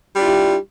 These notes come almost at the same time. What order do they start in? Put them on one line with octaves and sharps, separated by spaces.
G3 D4 F4 E4 G4